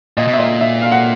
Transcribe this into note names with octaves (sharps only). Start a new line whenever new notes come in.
A#2 D#5
B2
E5
A#2 D#5
E5
F5
F#5